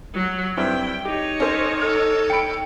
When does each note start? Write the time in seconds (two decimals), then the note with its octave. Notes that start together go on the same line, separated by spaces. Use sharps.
0.14 F#3
0.57 G2 C4 E4 G5
1.05 D#4 G4 C#5
1.40 C#4 A4 C5
1.82 A4 F6
2.30 G5 B5 C#7 D7